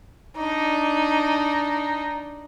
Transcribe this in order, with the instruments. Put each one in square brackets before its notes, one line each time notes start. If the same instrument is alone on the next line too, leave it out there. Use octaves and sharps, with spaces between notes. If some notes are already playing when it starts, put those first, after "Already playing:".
[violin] D4 D#4